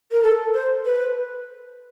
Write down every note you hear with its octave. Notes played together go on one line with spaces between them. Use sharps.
A#4
A4
C5
B4